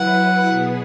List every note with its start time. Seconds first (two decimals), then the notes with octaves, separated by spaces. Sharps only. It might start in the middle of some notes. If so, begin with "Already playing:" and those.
Already playing: F#3 E4 B4 F#5
0.46 B2 B3 G#4